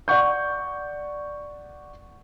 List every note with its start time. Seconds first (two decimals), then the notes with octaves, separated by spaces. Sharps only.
0.08 D5 F#5 C#6 G6